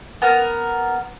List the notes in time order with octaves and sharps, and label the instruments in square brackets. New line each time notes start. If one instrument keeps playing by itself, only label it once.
[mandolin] B3 A#4